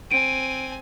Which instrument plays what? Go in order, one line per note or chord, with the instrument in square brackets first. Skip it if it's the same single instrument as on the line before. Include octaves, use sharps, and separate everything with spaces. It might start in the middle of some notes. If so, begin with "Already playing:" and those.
[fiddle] C4 G#5 [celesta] D7 D#7